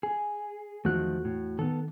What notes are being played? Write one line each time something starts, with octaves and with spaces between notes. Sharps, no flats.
G#4
E2 D#3 F3 A3 F#4 F#6
A2
D#3 B3 A4